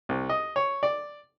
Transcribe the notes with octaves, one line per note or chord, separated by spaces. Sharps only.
C2
D#5
C#5
D5